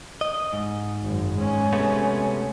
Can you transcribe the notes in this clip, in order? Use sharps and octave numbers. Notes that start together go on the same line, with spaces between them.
D#5
G#2
G#1 F#2
G#3 C#4
C3 A3 B3